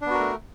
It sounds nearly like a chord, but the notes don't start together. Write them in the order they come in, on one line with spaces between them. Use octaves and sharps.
D4 B3 F#4 A#4 A3